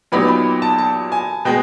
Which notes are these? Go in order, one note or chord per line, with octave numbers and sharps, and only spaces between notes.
A#2 F#3 B3 D#4 G4 B5
B5
A5
A5
G#5
B2 G#3 G5